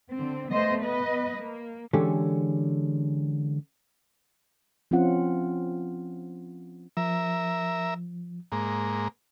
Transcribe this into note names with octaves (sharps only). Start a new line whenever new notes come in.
D3 C4
A3 B3 C5 D#5
B3 B4 D#5
A#3
D3 E3 G#3 C#4 G4 A4
F3 C4 C#4 F4 F#5
F3 A#4 E5
G#2 A#3